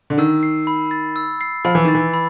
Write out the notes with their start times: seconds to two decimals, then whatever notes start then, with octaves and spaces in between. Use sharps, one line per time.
0.10 D3
0.18 D#3 E6
0.43 C7
0.67 B5
0.91 A6
1.16 E6
1.41 C7
1.65 F3 B5
1.75 E3
1.85 D#3 A6
1.95 E3
2.14 B5